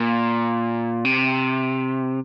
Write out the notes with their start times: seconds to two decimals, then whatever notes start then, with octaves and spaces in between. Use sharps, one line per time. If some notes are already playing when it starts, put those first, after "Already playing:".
Already playing: A#2
1.05 C3